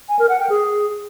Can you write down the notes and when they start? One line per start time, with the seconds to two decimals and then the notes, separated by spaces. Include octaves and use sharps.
0.09 G#5
0.19 A#4
0.29 F#5
0.39 G5
0.50 G#4